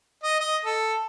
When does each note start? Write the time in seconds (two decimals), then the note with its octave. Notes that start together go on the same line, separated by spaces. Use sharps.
0.23 D#5
0.40 D#5
0.65 A4